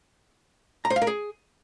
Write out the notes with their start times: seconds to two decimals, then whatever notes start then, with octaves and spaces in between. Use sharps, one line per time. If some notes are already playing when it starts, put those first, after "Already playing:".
0.85 A#5
0.90 C5
0.96 F5
1.02 A#4
1.07 G#4